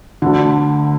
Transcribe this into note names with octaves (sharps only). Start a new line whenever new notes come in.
D2 D3